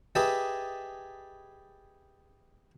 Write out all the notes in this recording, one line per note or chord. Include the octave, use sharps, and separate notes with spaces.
G4 G#4 B4 D#5 E5 A5